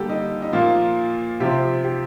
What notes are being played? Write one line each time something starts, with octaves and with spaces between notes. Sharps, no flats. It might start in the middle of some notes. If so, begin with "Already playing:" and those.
Already playing: D3 G3 A#3 G4 A4
D#4
D#4
A#2 F3 A#3 F4
C3 F3 C4 G4
G4